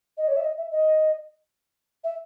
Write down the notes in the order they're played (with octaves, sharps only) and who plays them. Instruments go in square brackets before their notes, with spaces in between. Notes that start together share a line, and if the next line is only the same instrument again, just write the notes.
[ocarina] D#5
C#5
E5
D#5
E5
D#5
E5